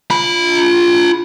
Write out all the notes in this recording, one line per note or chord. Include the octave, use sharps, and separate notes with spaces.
F4 B5